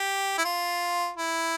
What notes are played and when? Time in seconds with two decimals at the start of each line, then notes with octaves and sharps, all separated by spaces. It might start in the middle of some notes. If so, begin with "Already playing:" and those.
Already playing: G4
0.38 E4
0.44 F4
1.16 E4